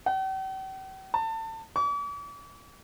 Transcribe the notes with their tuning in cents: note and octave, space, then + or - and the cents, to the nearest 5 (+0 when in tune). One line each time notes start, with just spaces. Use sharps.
G5 -45
A5 +30
D6 -45